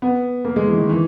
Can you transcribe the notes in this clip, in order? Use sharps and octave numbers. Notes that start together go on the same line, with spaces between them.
B3
A#3
G#3
E3
D#3
E3